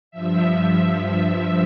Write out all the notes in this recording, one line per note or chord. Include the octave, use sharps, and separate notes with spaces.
G2 F3 E5